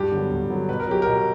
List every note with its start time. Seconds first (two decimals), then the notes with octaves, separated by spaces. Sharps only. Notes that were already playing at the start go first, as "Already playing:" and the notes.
Already playing: G2 G4
0.12 D3 F#3 B3
0.31 G2
0.50 D3 F#3 B3
0.69 B2 B4
0.80 A#4
0.87 F#3 C#4 G4
1.02 B2 A#4